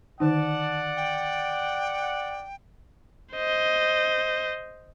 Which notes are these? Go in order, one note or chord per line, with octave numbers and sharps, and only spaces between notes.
D3 D#3 D#4 D5 F#5 A5
G5
C5 D#5